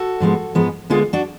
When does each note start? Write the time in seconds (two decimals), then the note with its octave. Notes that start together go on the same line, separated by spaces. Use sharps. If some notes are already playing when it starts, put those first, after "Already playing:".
Already playing: F#4 A4
0.20 G#2 F3 G#3 B3
0.55 G#2 F3 G#3 B3
0.90 D2 D3 G#3 B3 F4 G#4
1.13 D4 F#4